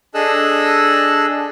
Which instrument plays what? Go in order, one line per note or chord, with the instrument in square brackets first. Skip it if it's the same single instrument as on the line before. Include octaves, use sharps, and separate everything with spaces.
[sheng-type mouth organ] D4 G#4 A4 D#5 E6 F#6